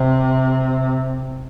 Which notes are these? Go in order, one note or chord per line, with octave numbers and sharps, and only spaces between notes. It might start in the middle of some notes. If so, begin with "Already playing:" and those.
Already playing: C3